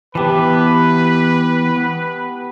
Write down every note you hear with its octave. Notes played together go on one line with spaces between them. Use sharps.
E3 B3 G4 B4 A5
B3